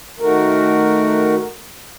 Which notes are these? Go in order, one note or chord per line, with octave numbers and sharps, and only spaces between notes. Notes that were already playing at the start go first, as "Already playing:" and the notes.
D#3 A3 F#4 A#4